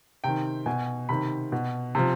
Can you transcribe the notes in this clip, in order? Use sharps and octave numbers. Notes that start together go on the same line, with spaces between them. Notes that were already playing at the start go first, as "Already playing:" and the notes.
C3 D#3 G5
B2 G#5
C3 D#3 B5
B2
C3 F3